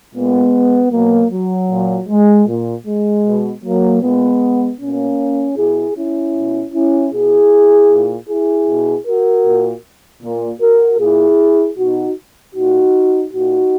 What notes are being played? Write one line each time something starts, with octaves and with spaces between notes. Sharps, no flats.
A#2 G#3 B3
B2 F#3 A#3
F#3
A#2
G#3
A#2
G#3
B2
F#3 A#3
A#2 G#3 B3
B2 A#3 C#4
B2 E4 G#4
C#4 E4
B2
C#4 E4
B2 E4 G#4
A#2
E4 G#4
B2
F#4 A#4
A#2
A#2
F#4 A#4
A#2 E4 G#4
B2 D#4 F#4
A#2 D#4 F#4
A#2 D#4 F#4